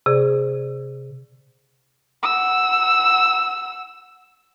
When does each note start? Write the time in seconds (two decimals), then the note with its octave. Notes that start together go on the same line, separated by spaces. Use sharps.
0.06 C3 G#4 D5
2.23 F#5 E6